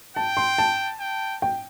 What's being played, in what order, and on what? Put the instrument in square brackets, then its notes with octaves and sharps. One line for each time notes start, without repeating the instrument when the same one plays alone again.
[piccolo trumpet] G5 [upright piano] A5
[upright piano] C6
A5
[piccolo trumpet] G5
[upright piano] G5